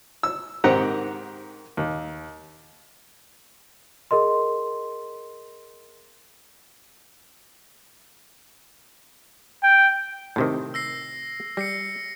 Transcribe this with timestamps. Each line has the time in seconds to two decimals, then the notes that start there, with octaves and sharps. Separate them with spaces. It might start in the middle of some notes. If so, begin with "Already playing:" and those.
0.23 E6
0.64 G#2 D#3 C4 G4 F#5 A#5
1.77 D#2
4.11 G#4 A#4 D#5 C6
9.63 G5
10.36 A2 C3 D#3
10.74 E6 A#6 C7
11.57 G3 A#6 C7 C#7